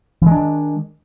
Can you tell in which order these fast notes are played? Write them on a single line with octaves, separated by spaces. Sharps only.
E3 G#3 D4 D#3